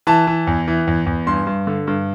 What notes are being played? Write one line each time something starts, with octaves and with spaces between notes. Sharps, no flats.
E3 A5
E3
E2
E3
E2
E2
G2 C6
G2
D3
G2